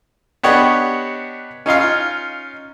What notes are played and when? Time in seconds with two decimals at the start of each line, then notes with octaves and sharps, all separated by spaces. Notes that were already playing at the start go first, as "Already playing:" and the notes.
0.43 B3 D4 G4 C#5 D#5 F#5
1.66 C#4 D#4 F4 F5